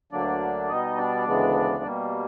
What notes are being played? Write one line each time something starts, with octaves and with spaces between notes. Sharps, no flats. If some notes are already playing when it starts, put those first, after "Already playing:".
D2 D3 F#3 A#3 D4 D5
B2 G3 B3 D#4 D#5
D4 D5
D2 C#3 E3 G#3 B3
B2 G3 A#3